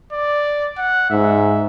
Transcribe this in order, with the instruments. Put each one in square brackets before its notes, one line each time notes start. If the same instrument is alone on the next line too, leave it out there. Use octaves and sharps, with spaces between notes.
[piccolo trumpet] D5
F#5
[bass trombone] G#2 [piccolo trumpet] E5